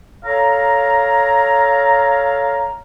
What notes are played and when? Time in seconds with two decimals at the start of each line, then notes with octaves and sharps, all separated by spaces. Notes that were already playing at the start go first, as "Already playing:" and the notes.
0.25 A4 C#5 F5 A#5